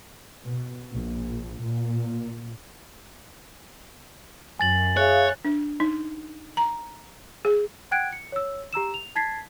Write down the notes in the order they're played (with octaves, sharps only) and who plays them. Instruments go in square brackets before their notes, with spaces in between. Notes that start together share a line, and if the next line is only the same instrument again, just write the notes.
[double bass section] B2
A#1
A#2
[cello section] F#2 [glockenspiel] G#5 A6 F#7
[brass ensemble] G#4 E5 F5 [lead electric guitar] C#5 [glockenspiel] F#6
[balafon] D4
D#4
A#5
G#4
[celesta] F#5 G5 F#6 G#6 D7
C#7
C#5 E6
G4 A#5 E6 E7
F7
A5 G#6 A6 B6 C7